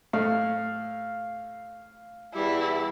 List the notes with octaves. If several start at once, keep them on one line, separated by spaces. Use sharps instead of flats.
A2 F5
E2 G3 E4